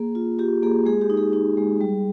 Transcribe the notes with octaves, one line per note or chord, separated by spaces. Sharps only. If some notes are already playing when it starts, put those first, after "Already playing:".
Already playing: A#3 G#4
F4
F4 G4
A#3 G#4
G#3 G#4
G4
D#4
G#4
D#4
G#3
G3